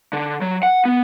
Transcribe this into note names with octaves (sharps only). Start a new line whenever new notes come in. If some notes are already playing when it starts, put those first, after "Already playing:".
D3
F#3
F#5
B3